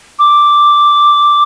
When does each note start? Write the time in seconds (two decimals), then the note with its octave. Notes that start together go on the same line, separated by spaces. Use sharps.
0.18 D6